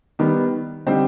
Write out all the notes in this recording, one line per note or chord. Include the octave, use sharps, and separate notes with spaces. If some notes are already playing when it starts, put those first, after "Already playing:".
D#3 G3 B3
D3 G3 C4 D#4